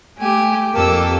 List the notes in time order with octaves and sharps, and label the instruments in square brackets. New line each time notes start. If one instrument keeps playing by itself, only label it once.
[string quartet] A3 G4 [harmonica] G#5
[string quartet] F2 A4 E6 [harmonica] A#3 G4